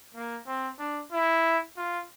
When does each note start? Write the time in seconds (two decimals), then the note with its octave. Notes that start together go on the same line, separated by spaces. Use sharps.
0.15 A#3
0.47 C4
0.79 D4
1.12 E4
1.77 F4